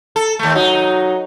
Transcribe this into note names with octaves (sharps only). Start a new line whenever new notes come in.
A4
D#2 A3
F#3 D#4